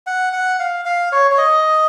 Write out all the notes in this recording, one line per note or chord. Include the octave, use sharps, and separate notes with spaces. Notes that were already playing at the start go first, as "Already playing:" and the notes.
F#5
F#5
F5
F5
C#5
C#5
D#5